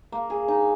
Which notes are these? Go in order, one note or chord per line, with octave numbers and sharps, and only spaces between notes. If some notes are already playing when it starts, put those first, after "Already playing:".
A#3
G#4
D#4